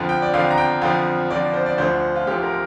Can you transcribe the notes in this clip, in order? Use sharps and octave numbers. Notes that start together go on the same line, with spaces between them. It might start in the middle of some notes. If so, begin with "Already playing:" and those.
Already playing: F2 D3 F3
G5
D5
F2 D3 F3 F5
A#5
G5
F2 D3 F3 F5
F2 D3 F3 D5
C5
D5
D2 D3 F3 C5
F4
D2 D3 F3 G4
A#4